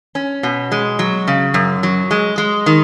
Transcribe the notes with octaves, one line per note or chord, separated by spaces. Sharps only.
C#4
B2
G#3
F#3
C#3
F#2
F#3
G#3
G#3
D#3